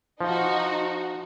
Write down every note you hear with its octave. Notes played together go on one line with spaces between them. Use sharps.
F3 D#4 F#4